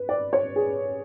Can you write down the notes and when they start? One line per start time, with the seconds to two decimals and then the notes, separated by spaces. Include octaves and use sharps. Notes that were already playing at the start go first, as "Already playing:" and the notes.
Already playing: B4
0.09 D5
0.33 C#5
0.56 G#4